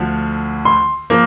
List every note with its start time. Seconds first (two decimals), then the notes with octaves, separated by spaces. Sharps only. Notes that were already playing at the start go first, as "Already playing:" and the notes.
Already playing: D2 D3 F3
0.65 C6
1.10 F3 A#3